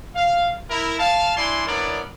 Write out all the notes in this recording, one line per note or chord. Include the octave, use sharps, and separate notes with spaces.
F5
E4 A#4
F5 A5
D4 E4 D5 G#5 C6
B3 D4 E4 A#4 C#5 D5